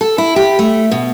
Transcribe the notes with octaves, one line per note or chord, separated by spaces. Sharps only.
A4
E4
G4
A3
B2